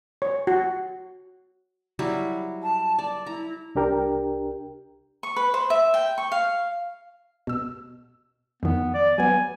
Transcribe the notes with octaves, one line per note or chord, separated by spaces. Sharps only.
C#5
F#4
F#3 G3 E4
A5
D5
E4 A#5
C2 D4 G4 A#4 G5
C#6
B4
C5
E5
G5
C#6
F5
B2 E6
F2 D#3 B3
D5
F#3 B3 G#5